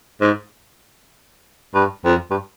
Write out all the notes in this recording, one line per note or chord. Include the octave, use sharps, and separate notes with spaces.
G#2
G2
F2
G2